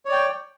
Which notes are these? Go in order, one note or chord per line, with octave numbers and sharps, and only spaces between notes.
C#5 D5 G5